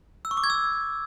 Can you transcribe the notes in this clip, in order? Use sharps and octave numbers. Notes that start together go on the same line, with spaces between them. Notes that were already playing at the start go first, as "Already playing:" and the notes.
E6
C#6
D6
G#6
E6